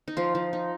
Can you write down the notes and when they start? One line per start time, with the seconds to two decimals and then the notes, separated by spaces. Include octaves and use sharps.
0.08 D#4
0.17 F3 F4
0.35 F3
0.53 D#4